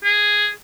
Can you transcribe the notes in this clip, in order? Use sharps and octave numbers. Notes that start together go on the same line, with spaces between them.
G#4